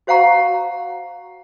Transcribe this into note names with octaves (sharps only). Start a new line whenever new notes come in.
F#4 C5 F5 F#5 A#5 C#6